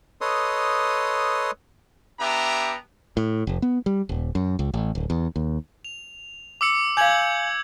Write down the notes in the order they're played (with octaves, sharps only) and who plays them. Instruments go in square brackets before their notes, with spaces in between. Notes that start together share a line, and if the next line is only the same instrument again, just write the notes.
[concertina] A4 B4 C#5 D#5 C6 D#6
[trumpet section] B3 D4 G4 E5 A#5
[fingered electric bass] A2
F1
B3
G3
D#1
F#2
C#2
A1
D1
E2
D#2
[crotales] F7
D6 E6 C#7
[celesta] F5 G#5 [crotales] G6 G#6 F#7